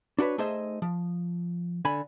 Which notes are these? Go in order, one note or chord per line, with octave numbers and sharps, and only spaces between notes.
D4 F#4 A4 B4 C#5
A3 D#4 G#4 C5 D#5 E5
F3
D3 G#5 B5